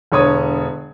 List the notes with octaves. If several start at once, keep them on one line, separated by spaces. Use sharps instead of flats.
E1 D3 C#5 D#6